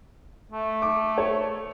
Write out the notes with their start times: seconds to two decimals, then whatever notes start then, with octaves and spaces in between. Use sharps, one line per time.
0.52 A3
0.82 D6
1.18 C#5